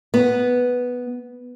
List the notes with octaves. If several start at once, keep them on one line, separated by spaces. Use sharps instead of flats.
B3